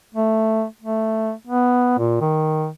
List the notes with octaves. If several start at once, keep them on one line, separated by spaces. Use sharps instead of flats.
A3
A3
B3
A#2
D#3